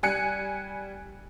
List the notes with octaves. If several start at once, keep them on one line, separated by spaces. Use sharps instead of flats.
G3 G#5 F#6 C#7